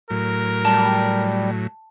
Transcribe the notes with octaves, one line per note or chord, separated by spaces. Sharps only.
A2 F#3 A#4
G3 A5